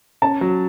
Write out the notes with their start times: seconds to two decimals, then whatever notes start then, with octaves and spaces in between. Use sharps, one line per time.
0.22 C#4 A5
0.41 F#3